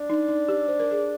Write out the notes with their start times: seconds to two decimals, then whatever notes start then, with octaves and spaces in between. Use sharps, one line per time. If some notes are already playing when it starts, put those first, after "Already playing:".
Already playing: D4
0.10 D#4
0.29 D#4
0.49 G4
0.68 C5
0.80 A#4
0.91 G#4